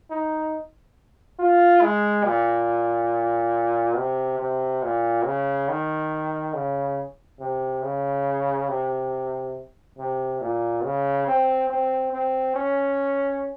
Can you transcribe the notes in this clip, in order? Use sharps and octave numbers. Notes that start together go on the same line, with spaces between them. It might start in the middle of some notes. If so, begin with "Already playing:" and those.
D#4
F4
G#3
A#2
C3
C3
A#2
C#3
D#3
C#3
C3
C#3
C3
C3
A#2
C#3
C4
C4
C4
C#4